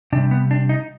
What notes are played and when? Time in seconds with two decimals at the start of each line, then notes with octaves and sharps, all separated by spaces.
0.12 C3 D4
0.15 G3
0.31 B3
0.51 D4
0.69 D#4